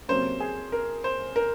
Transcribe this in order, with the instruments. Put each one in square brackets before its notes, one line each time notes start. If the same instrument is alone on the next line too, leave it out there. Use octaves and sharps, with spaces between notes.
[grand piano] F2 C3 F#3 A#3 C#4 C5
G#4
A#4
C5
A#4